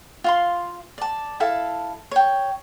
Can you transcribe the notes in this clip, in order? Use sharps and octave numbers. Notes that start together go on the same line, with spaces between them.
F4 F5 C6
D5 A5
E4 A4 F5 A5
C#5 G5